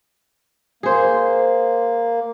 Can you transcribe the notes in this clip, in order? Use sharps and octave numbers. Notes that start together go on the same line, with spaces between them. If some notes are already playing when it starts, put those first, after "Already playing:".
A#3 G#4 C5